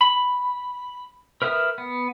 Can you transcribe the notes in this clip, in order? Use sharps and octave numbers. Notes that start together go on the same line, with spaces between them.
B5
A#4 B4 E5 D#6 F6
B3